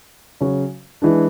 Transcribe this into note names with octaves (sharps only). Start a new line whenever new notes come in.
C#3 F#3 C#4 F#4
E3 G#3 D4